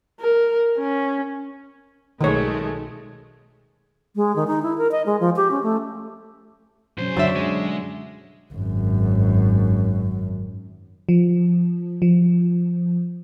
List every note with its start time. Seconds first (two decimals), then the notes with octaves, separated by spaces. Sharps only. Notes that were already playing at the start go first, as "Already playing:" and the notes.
0.20 A#4
0.78 C#4
2.21 B1 D#3 G#3 A3 C#5
4.16 G#3
4.36 D#3
4.47 D#4
4.63 E4
4.78 A#4
4.92 D#5
5.06 G#3
5.20 F3
5.36 G4
5.51 C#4
5.63 A3
6.98 C#2 B2 F#3 C#4 C5
7.17 F#2 D3 F#3 D4 F#4 E5
7.36 G#3
8.53 G#1 F#2
11.09 F3
12.02 F3